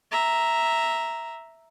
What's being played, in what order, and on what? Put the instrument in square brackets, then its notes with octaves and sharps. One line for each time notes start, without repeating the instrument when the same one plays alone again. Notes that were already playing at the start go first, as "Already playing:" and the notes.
[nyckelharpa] E5 A#5